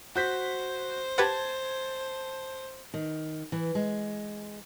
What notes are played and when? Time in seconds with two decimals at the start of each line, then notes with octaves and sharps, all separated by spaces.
0.16 F#4 C5 G6 B6
1.18 G4 B4 F#5 A5 G#6 A6
2.94 D#3
3.52 E3
3.75 G#3